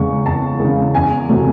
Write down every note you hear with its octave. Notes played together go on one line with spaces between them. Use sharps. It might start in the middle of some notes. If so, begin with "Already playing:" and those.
Already playing: E2 C#3 G#3 C#6
E2 A5
C#3 G#3
E2 G#5
C3 F#3 A3